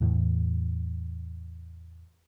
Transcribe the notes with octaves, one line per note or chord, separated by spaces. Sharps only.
E2 A2 E3